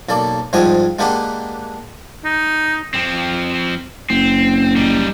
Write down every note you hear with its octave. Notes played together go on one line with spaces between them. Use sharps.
B1 A#3 A4 D5
G#2 F3 G3 D#5 G5 G#5
G#3 A#3 D4 G4 B4 F#5
D#4
F3 C4
F#1 C4
G3 D#4